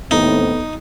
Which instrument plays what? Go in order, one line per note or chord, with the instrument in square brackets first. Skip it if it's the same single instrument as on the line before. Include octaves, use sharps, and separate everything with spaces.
[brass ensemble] D#2 A2 C4 [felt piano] B3 A4 [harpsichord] D#4